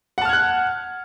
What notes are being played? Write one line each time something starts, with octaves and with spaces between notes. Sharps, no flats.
F#5 A5 F6 F#6 G#6